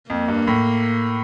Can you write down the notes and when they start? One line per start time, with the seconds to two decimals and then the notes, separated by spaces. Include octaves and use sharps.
0.10 F2 A#3
0.28 G2
0.47 A2